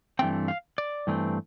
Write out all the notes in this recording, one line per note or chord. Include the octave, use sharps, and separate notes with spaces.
G2 E3 A3 C4 G5
F5
D5
G2 E3 A3 C4